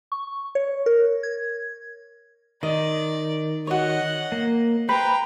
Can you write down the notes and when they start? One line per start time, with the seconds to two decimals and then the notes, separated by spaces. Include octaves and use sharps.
0.12 C#6
0.55 C#5
0.86 A#4
1.23 G#6
2.63 D#3 D5 D#5
3.67 F#4 C#5 D#5 F#5
4.32 A#3
4.89 B4 C5 G5 A#5 B5